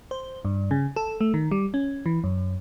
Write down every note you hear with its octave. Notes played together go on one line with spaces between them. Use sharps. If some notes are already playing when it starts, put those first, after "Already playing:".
C5
G2
C#3
A4
A3
D#3
G3
C#4
E3
F#2